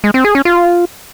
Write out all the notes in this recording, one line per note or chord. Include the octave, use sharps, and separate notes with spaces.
G#3
C4
G#4
C#4
F4